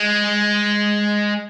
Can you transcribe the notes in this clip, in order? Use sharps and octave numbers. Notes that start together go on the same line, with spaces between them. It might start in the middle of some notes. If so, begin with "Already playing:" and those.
Already playing: G#3